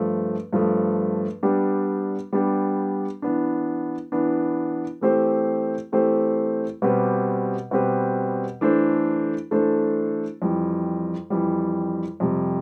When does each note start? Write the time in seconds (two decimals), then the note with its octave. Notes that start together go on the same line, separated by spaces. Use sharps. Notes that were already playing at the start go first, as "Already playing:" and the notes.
Already playing: G2 F3 A3
0.53 G2 F3 A3
1.43 G3 B3 D4 G4
2.33 G3 B3 D4 G4
3.22 E3 B3 D4
4.12 E3 B3 D4
5.01 E3 A3 C4 G4 C5
5.92 E3 A3 C4 G4 C5
6.82 B2 G3 C4 G4 B4
7.71 B2 G3 C4 G4 B4
8.61 E3 A3 D4 A4 C5
9.51 E3 A3 D4 A4 C5
10.42 F2 E3 G3
11.30 F2 E3 G3
12.20 F2 C3 G3